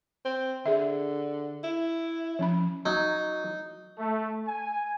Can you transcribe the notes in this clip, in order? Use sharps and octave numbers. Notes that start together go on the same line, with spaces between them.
C4
D3 G#4 E5
E4
F3 C#4 B5
F#3 D#4
A3
G#5